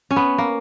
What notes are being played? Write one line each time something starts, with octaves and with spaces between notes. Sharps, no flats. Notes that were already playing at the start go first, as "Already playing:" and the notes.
C#4
B3
A#3